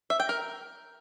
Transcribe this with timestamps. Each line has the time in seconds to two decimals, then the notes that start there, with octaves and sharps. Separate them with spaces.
0.10 E5
0.20 G5
0.29 A#4